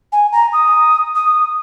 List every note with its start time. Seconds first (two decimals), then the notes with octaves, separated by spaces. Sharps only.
0.12 G#5
0.32 A#5
0.53 D#6
1.15 D#6